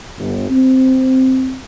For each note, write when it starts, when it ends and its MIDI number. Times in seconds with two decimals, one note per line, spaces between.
0.19 0.47 31
0.51 1.57 60